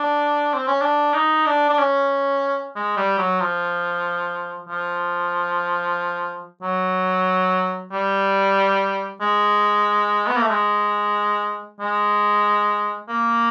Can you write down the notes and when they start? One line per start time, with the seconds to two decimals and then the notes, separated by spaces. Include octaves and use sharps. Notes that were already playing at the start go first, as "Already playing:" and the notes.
Already playing: D4
0.54 C4
0.67 C#4
0.81 D4
1.14 D#4
1.46 D4
1.70 D4
1.79 C#4
2.76 G#3
2.97 G3
3.18 F#3
3.40 F3
4.69 F3
6.62 F#3
7.92 G3
9.21 G#3
10.27 B3
10.36 A#3
10.42 A3
10.51 G#3
11.80 G#3
13.09 A#3